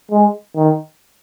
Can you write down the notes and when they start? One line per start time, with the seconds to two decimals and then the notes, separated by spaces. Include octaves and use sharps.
0.11 G#3
0.56 D#3